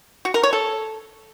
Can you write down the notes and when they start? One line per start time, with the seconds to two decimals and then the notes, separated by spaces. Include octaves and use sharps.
0.25 F#4
0.34 A#4
0.43 C#5
0.53 A4